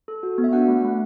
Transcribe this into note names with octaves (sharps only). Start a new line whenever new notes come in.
A4
F#4
B3
E5
D4 F#4 F#5
A3
A3